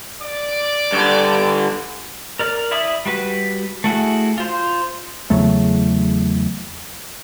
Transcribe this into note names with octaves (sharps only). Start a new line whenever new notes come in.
D5 D6
G2 D3
A#4 D5 F6
E4 D5 E5 B5 D#6
G3 F#4 B4
A3 E4 F#4 G#4
F4 C5
E2 C#3 F#3 A3